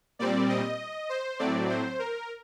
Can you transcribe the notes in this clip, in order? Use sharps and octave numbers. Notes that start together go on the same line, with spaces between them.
A#2 G3 C4 D5
D#5
C5
A2 F#3 A3 C4 D5
C5
A#4